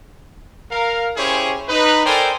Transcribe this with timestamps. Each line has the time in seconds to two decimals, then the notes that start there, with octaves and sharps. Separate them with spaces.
0.71 A#4 F5
1.17 C#4 E4 G4 G#4 C5 C#5
1.68 D#4 B4
2.05 A4 A#4 C5 D5 G5 G#5